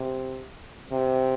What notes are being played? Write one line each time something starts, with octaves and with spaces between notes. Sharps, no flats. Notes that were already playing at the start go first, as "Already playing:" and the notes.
Already playing: C3
C3